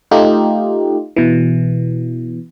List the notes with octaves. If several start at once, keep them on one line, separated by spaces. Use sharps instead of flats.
A3 D#4 F4 G4
B2 E3